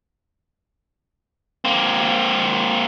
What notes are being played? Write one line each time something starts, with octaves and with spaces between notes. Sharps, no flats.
A#3 C4